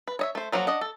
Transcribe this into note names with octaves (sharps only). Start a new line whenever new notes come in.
B4
C#5 D#5 E5
A3 C5
F3 F#3 A#3 F#4
D4 D#5 F#5
A4